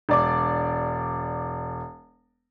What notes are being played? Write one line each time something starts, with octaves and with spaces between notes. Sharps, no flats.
E1 D5 D6